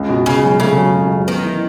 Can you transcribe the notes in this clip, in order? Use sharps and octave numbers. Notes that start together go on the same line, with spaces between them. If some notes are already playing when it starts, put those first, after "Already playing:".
Already playing: C#2
B2
C#2 C#3
F#3
C#3 A3
F#3
C#2
F#3
D#3 B3
E3